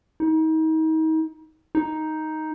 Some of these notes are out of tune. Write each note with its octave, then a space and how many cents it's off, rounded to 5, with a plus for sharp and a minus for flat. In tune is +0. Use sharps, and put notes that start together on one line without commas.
D#4 +35
D#4 +5